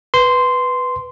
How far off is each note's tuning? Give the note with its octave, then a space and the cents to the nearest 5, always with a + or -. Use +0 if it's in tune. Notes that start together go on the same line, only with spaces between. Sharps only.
B4 +0 C6 -10